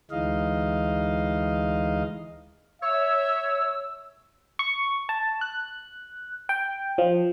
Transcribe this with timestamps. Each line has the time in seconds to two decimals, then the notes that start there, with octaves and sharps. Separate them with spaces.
0.11 D2 E3 G#3 D#4 D#5 F5
2.82 C#5 E5 E6
4.59 C#6
5.09 A5
5.41 F#6
6.49 G5
6.98 F3